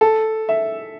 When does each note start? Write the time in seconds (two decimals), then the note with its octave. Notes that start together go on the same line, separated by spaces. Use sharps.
0.01 A4
0.49 E5